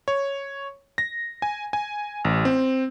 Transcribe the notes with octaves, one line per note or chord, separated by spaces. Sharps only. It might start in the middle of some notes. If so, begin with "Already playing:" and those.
C#5
A#6
G#5
G#5
A1
C4